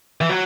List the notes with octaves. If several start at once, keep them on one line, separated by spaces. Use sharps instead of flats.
E3
F#3